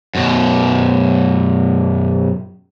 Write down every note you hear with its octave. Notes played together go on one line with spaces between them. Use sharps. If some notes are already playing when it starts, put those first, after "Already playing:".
F#2 B2